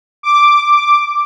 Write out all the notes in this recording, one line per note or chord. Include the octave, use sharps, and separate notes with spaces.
D6